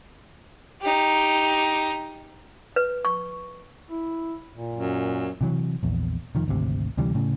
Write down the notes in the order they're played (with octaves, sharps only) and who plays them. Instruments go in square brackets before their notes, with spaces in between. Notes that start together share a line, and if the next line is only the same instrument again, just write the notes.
[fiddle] D#4 G4
[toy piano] B4
C#6
[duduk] E4
A#2
[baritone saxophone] F#2
[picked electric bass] C3 E3 F#3
A#1 E2
F1 D#3 F3
G#1 D2 C3
D2 C3 E3 G3
A2 C#3